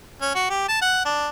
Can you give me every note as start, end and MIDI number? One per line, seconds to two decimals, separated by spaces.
0.22 0.30 61
0.35 0.50 66
0.50 0.68 67
0.69 0.80 81
0.82 1.01 78
1.05 1.29 62